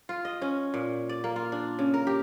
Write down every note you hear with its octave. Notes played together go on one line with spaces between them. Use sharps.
F4
D#5
C#4
A#2
D5
A#3
F4
D4
C#3
A#4
G4